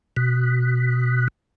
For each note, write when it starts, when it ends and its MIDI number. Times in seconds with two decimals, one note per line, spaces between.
0.17 1.28 47